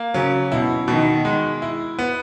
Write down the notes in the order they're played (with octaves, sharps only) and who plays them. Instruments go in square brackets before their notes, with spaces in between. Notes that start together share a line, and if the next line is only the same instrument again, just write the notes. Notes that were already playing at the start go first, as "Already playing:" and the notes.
Already playing: [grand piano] A#3
[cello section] C#3 [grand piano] F#3
[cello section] B2 [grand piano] E4
[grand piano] B2 [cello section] D#3
[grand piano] G#3
E4
B3